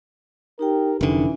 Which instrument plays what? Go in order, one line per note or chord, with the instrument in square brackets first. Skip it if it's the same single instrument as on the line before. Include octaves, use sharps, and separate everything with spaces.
[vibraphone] D#4 G4 G5 [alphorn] A#4
[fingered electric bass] F1 D3 [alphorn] E3 [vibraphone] C#4 D#4